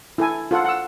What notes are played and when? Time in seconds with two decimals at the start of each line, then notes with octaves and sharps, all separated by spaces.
0.18 E4 A4 G#5
0.51 F4 A4 F#5
0.64 F#5 E6